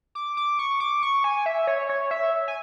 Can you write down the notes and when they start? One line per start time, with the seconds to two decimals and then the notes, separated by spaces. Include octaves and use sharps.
0.15 D6
0.37 D6
0.59 C#6
0.80 D6
1.03 C#6
1.24 G#5
1.46 E5
1.67 C#5
1.89 C#5
2.11 E5
2.48 G#5